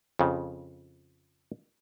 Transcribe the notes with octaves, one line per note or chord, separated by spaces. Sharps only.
F2 C#3